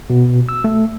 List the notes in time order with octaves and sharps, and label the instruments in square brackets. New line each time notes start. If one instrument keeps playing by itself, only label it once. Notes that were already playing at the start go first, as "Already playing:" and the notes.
[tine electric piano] B2
E6
A3